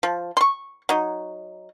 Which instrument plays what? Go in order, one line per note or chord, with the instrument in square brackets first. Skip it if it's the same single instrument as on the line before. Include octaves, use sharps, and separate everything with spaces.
[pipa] F3
C6 C#6
F#3 D#4